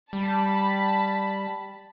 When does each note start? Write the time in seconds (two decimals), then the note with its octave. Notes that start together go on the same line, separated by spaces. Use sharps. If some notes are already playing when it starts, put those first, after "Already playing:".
0.13 G3 A5 B5